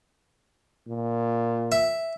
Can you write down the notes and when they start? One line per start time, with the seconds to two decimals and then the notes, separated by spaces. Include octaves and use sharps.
0.88 A#2
1.72 E5